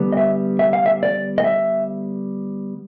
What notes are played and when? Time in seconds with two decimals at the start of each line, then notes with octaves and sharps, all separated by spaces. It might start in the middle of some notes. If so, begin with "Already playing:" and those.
Already playing: D3 G3 B3
0.12 D#5
0.17 E5
0.59 E5
0.73 F5
0.86 E5
1.03 D5
1.38 D#5
1.44 E5